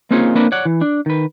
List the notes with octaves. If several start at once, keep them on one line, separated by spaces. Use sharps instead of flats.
A#3 C4 C#4 D#4 F4 G#4
A#3 C4 D4 E4 A#4 B4
C#5 D5 F#5
E3
D4
D#3 B4